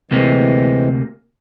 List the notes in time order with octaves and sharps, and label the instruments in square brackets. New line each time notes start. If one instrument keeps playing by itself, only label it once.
[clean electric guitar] D2 C3 A#3 [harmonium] E3 G#3 C4